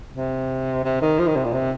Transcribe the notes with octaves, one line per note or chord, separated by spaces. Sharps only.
C3
C3
D#3
F3
D#3
C3
A#2
C3